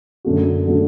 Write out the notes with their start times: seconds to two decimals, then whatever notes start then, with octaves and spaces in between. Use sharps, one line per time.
0.25 F#2 D3 A3 F#4
0.67 D3 A3 F#4